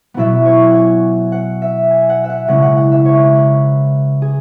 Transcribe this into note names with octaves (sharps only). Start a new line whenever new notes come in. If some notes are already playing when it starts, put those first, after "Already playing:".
B2 F#3 B3 E4 E5
C#5
F#5 G#5
F#5
E5
G#5
F#5
E5
F#5
C#3 G#3 C#4 E4 F#5
F#5
F#5
E5
C#5
C#5
B4
G#4